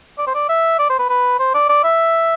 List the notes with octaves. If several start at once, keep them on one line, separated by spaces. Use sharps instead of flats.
D5
C5
D5
E5
D5
C5
B4
B4
C5
D5
D5
E5